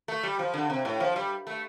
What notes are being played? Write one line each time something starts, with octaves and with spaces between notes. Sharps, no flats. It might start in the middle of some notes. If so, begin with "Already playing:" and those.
A3
G3
F3
D3
C3
A2
F3
G3
A3